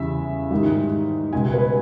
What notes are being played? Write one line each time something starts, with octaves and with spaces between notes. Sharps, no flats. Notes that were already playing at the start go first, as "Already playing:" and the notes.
Already playing: E2 C#3 G3 E5
G#2 D#3 G3
C#2 B2 G3 G#5
B4